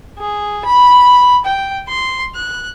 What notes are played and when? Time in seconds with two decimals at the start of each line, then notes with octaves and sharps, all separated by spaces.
0.19 G#4
0.65 B5
1.45 G5
1.88 C6
2.36 F#6